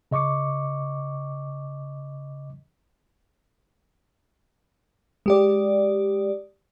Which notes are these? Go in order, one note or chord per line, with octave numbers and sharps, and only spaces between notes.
C#3 D#5 C#6 D6 C#7
G#3 G4 D5